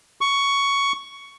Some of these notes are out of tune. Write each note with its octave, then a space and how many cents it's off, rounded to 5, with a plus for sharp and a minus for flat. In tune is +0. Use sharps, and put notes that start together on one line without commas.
C#6 +10